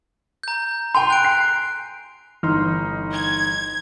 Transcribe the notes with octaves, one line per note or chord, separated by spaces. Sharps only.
A#5 G6
G5 G#5 C6 F7
F#6 D7
C7
G1 E3 D#4 C6 F6
G#6